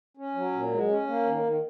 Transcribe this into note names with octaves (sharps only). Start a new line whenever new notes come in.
C#4
F#3
A#2
G#3
C#4
A#3
D#3
D#3